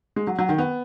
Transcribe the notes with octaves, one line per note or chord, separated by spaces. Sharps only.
G#3
F#3
F#3
D#3
B3